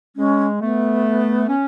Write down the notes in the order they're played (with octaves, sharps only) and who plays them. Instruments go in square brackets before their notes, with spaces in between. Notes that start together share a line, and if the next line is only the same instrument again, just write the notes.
[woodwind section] G#3 [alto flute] C#4
[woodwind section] A3 [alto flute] B3
[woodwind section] C#4